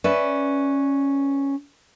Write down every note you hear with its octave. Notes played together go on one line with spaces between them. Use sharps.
C#4 B4 D5 E5